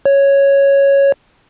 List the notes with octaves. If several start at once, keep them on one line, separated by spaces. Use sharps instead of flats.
C#5